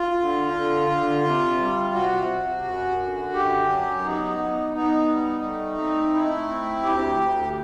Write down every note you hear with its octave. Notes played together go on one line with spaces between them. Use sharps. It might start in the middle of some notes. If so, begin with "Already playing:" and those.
Already playing: F4
D3
D3
D3
C3
G3
C3 F#4
C3
F#2
D3
F#2 G4
F#3
B3 D#4
B3
B3 D#4
G3
A3
C4
A3 E4
C4
D2 G4
D2